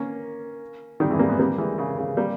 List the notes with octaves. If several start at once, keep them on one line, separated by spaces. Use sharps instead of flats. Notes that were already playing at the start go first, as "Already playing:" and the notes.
Already playing: A#3 C#4
D#3 G3
E3 G#3
G3 A#3
G#3 B3
G3 A#3
E3 G#3
C#3
C#3
G3 A#3